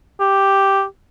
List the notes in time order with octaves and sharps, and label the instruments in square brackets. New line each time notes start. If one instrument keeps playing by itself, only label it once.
[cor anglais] G4